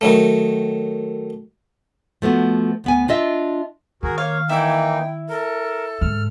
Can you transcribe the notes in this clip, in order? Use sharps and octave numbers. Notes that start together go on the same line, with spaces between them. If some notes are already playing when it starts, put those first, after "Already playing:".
D#3 F#3 A3
F3 A3 B3 F#4
D2 B3 G#5
D4 F4 D#5 E5
D#3 F#4 G#4 A#4
A#3 C#5 F5
E3 A#3 D#4 E4 G5
A4 A#4
G#2 D3 F6